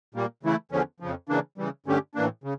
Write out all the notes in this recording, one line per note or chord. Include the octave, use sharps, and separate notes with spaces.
A#2 G3 A#3
C#3 E3 A3 E4
E2 D3 F3 C#4
F2 C#3 F3
C#3 E3 A#3 D4
C#3 E3 G3
G2 D3 A3 C#4 G4
A2 E3 A#3 D4
C#3